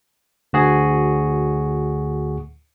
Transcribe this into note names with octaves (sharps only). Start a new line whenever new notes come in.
D2 F#4 G#4